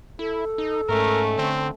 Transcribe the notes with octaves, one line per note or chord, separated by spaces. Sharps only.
E4 A4
D#4
G#2 A3 C#4 A#4
D3 C4